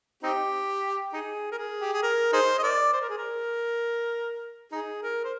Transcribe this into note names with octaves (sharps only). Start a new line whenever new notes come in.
C4 D#4 G4
D#4 G#4
A#4
G#4
G4
G#4
A#4
D#4 G#4 C5
D#5
A#4 D5
C5
A#4
G#4
A#4
D#4 G#4
A#4
C5